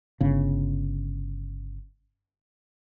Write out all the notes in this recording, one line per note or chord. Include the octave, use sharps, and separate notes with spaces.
G1 C#3